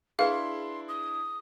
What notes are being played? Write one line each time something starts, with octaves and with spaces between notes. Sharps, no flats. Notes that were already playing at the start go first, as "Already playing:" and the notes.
D4 E4 G#4 B4 F5 C6
D#6